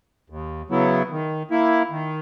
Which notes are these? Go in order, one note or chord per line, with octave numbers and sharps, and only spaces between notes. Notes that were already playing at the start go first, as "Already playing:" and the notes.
D#2
C#3 F#3 B3 E4
D#3
A#3 E4
D#3